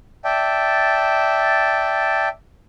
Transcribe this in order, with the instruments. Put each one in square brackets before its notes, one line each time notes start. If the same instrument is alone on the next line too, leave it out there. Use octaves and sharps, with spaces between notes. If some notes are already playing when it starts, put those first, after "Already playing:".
[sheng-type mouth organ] D5 E5 G5 A5